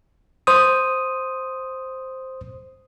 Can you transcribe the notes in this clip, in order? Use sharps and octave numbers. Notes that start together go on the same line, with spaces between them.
C5 D#6